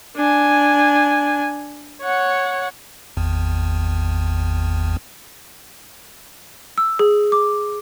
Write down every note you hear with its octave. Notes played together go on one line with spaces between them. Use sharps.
D4 G#5
C#5 F#5
G#1 E2
E6
G#4
D6